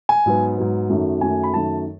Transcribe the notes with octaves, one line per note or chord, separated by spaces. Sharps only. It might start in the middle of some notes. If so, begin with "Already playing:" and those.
G#5
G#2 F#3 B3
G#2 F#3 B3
F#2 D#3 F#3 A3
F#2 D#3 F#3 A3 G#5
B5
F#2 D#3 F#3 A3 A5